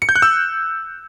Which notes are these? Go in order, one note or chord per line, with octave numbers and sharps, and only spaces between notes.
C#7
G6
F#6
E6